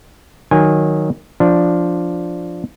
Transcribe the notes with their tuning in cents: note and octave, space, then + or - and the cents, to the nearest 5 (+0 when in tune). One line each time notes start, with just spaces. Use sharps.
D#3 +0 F#3 +0 G#5 -20
F3 +0 D4 +0